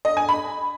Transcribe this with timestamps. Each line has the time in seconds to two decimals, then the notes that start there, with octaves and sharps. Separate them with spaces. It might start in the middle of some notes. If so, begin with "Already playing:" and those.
0.05 D#5
0.17 G#5
0.29 B5